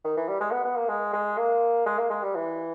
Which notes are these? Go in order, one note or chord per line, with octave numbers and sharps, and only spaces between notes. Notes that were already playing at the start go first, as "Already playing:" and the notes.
D#3
E3
G3
G#3
B3
B3
A#3
G#3
G#3
A#3
G#3
A#3
G#3
G3
E3